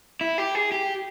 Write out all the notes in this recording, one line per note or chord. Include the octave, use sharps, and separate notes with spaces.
E4
G4
G#4
G4